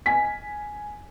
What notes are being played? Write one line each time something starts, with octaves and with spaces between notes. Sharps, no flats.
G#5 B6